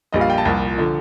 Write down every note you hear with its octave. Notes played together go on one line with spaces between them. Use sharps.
A#1 A#2 G3 D#5
F5
G5
A5
C2 A#2 F3
D3 F3